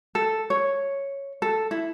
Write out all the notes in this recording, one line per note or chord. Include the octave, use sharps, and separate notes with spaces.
A4
C#5
A4
E4